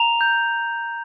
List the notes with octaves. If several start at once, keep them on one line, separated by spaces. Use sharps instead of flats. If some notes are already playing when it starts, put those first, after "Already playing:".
Already playing: A#5 F7
G6